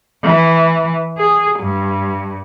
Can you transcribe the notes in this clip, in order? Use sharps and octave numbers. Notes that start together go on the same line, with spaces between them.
E3
G#4
G2